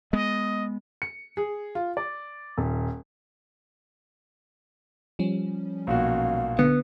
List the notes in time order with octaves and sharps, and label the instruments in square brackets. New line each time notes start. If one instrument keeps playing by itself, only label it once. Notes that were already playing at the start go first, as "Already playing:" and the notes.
[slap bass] G#3 B3 [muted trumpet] D#5
[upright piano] C#7
G#4
F4
D5
D#1
[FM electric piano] F3 G3 C#4
[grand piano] B1 A#2 F#4 [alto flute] F5
[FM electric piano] D3 [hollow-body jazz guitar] B3